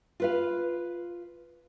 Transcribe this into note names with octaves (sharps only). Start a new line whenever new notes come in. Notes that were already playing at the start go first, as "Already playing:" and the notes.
F4 B4 F5